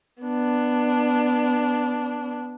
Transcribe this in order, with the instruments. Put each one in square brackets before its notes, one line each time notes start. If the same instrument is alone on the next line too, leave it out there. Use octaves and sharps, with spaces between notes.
[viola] B3 D4